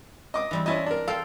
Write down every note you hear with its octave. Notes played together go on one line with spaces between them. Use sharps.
D#5 D6 D#6
E3 G3 C4
C#4 E4 D#5 G#5 A5
D4 A#4
A4 C5 F5 G5